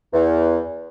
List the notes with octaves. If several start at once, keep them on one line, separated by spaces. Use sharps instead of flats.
E2